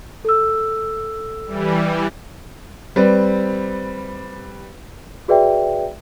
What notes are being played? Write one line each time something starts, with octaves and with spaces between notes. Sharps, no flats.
A4 E6
E3 G3
G3 C4 B4
F#4 G#4 B4 D5 E5 G5